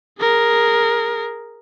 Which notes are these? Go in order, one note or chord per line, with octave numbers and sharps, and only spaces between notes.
G#4 A#4